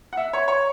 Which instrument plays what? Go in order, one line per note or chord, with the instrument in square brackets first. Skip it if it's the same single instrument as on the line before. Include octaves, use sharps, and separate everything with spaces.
[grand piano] F#5
E5
C#5
C#5